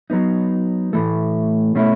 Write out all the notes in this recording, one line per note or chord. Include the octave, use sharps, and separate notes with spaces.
F#3 B3 D#4
A2 E3 A3
B2 A3 C#4 E4